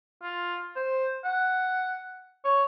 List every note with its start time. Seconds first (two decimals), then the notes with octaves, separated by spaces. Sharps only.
0.23 F4
0.76 C5
1.25 F#5
2.45 C#5